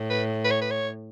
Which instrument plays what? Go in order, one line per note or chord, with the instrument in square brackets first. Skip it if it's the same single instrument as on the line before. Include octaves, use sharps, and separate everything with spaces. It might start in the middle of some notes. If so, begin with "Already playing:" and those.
Already playing: [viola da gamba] A2
[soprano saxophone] B4
B4
C#5
B4
C#5